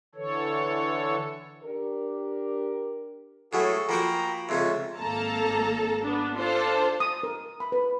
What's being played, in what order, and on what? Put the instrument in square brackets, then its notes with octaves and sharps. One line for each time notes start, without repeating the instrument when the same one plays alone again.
[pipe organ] D3 E3 A4 C#5
[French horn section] D4 G4 A#4
[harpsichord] A2 F#3 A3 [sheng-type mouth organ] F#4 G#4 A4
[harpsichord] F3 A#3 F#4 [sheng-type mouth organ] G5 A#5 B5
[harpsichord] F2 G#2 C#3 [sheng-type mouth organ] F4 E5
[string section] G#1 A#3 A4 A5 A#5
B3 D4
D4 F4 A4 C5 A5
[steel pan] D#6
A#4
B5
B4